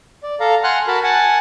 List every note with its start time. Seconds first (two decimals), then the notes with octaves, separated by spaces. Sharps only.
0.23 D5
0.40 A4 F5 A#5
0.64 F#5 G#5 C6 F6 F#6
0.87 F#4 A#4 A5 B5
1.03 F#5 G#5 A5